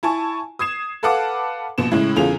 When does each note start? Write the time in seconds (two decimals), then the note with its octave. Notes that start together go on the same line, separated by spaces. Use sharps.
0.03 E4 G#5 A5 C#6
0.59 D#6 G#6 C7 E7
1.03 A4 B4 F5 F#5 A5 D6
1.78 A#1 B2 E7
1.91 A2 C#3 G#3 E4
2.16 G1 E2 C#3 F4 G#4 F7